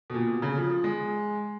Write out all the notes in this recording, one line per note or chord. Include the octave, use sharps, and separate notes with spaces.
B2
A#2
B2
C#3
F3
F3
G#3